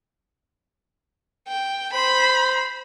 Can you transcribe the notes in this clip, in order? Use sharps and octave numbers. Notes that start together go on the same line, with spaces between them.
G5
C5 B5